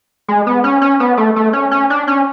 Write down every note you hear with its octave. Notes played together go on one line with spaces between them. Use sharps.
G#3
B3
C#4
C#4
B3
A3
A3
C#4
C#4
D4
C#4